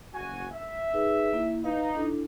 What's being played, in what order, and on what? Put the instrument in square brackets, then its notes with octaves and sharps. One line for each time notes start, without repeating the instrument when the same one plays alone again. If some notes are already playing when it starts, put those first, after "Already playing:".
[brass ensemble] F#1 F#4 G#5
E5
[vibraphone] D#4 G#4 B4
A#3 E4
[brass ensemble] D#4 [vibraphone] B4 F5
[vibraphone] D4 E4 A4